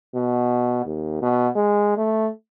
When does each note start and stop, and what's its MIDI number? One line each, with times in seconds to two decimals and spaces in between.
0.14 0.83 47
0.85 1.19 39
1.21 1.48 47
1.55 1.94 56
1.97 2.29 57